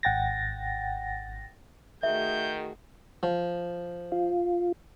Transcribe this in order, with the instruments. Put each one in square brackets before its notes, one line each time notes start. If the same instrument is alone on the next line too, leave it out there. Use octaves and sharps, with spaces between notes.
[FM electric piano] G#1 F#5 G5 A6 A#6
[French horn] D#3 [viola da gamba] A3 F#4 G#4 [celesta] E5 [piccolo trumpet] G6
[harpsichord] F3
[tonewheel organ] F4